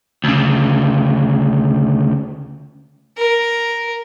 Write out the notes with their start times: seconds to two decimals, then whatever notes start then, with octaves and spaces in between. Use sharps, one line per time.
0.24 D2 C#3
3.17 A#4